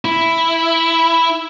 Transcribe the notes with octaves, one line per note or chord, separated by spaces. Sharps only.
E4